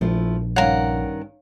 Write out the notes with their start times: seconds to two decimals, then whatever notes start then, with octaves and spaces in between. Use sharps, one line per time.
0.01 A#1 F3 A3 E4
0.56 G2 D#3 C#4 A#4 C#5 F5 F#5 F7